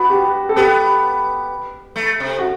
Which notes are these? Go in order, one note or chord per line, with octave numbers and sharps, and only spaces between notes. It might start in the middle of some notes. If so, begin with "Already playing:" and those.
Already playing: B3 F#4
G4
A4
B3 G4
A3
C3
F#4